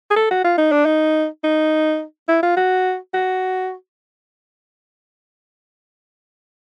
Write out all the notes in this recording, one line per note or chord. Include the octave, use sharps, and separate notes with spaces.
G#4
A4
F#4
F4
D#4
D4
D#4
D#4
E4
F4
F#4
F#4